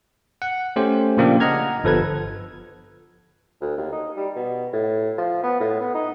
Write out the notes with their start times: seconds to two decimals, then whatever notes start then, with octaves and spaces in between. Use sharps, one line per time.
0.42 F#5
0.76 A3 C#4 G4 C5
1.17 A#2 C#3 F3 A#3 D4 G4
1.40 D#5 F#5 A#5 F6 G#6
1.84 G1 F3 A4 B4 G#6
3.61 D2
3.77 D#2
3.92 D#4
4.16 G3
4.36 B2
4.73 A2
5.18 F3
5.43 B3
5.60 A2
5.81 B3
5.95 D#4